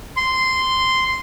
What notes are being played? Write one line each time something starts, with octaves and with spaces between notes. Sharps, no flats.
C6